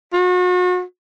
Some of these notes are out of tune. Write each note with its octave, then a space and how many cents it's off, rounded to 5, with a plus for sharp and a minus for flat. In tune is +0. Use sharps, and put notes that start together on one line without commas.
F#4 -40